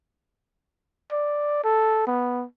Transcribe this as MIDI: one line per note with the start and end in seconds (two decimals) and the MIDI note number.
1.12 1.63 74
1.64 2.06 69
2.07 2.45 59